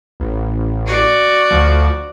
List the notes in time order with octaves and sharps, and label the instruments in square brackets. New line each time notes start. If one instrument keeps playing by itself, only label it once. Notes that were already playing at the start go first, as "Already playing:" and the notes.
[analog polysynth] A1
[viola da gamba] F#4 D5
[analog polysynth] D2 F3